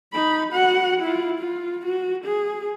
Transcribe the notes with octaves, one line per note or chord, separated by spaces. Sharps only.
D#4 B5
F#4 F#5
E4 F4
F4
F#4
G#4